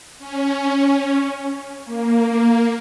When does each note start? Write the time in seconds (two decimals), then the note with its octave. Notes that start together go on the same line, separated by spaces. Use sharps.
0.19 C#4
1.85 A#3